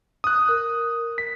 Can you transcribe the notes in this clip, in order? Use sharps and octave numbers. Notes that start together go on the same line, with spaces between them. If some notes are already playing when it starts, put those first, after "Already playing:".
D#6 F#6
A#4
B6